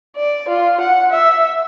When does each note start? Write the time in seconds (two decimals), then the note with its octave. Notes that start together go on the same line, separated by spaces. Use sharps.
0.16 D5
0.48 F4
0.80 F#5
1.10 E5